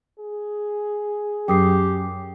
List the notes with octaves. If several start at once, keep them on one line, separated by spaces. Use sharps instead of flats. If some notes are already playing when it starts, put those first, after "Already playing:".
G#4
F#2 G4 G5 D#6 C7